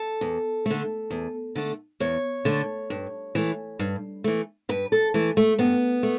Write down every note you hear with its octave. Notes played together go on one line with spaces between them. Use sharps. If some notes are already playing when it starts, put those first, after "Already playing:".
Already playing: A4
E2
D3 A3
E2
D3 A3
E2 C#5
D3 A3
G2
E3 A3
G2
E3 A3
G2 B4
A4
E3 A3
A3
G2 B3
A3